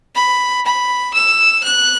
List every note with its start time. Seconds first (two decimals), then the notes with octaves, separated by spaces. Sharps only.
0.15 B5
0.66 B5
1.14 E6
1.63 F#6